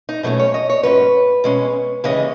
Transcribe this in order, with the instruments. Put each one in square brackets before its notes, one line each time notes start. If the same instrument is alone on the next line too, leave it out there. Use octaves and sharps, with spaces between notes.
[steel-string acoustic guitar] D#4
B2 F#3 A3 C#4 D#4
C#5
D#5
C#5
G#2 F#3 C#4 B4
B2 G#3 C#4
D#2 C#3 E3 G#3 C#4 D#5